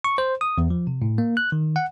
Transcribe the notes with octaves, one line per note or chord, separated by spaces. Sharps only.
C#6
C5
D#6
E2
F3
C3
A2
A#3
F#6
D#3
F#5